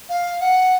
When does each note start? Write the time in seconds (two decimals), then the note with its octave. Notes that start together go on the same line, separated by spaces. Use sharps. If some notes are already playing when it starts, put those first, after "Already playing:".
0.09 F5
0.41 F#5